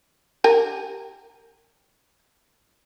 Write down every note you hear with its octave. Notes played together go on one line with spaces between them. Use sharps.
G4 A#4 G#5